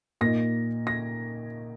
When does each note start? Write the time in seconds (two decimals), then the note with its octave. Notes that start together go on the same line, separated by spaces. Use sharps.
0.21 A#2 A#3 D#4 A#6
0.87 A#6